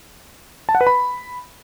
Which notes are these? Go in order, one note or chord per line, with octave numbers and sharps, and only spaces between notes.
A5
F#5
B4
B5